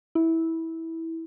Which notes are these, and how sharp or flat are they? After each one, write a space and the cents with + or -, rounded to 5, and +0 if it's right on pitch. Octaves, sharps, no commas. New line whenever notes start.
E4 -15